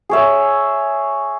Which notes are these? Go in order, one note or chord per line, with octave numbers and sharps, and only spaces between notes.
G#4 C#5 E5